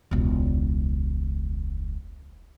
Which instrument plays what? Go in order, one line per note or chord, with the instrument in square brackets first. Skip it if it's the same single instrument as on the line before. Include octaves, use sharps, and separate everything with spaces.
[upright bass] E1 C#2